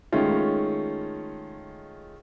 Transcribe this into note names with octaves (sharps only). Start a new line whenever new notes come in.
D#3 G#3 A3 C#4 F4